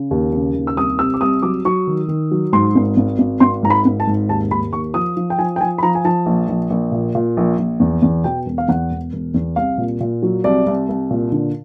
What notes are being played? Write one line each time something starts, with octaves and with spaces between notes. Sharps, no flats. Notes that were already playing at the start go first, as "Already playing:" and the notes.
Already playing: C#3
D#2
C#3
D#2
E6
C2 D#6
C3 E6
D6
C2 D#6
F#3 D6
F#3 C#6
D#3
D#3
F#3
G#2 C6
G#1
G#1
G#1
G#1 C6
G#2 A#5
B5
G#1
A5
G#2
D#2 A5
D#2 B5
D#2 C#6
F3 D#6
F3
G5
F3 G#5
G5
F3 G#5
B5
F3 A#5
G#5
F3 A5
A#1
A#1
A#1
A#2
A#2
A#1
A#1
E2
E2
B2 G5
E1
F5
E2 F#5
E1
E1
E2
C2 F5
A#2
A#2
F#3
C2 D5
C2
C2
A#2
D3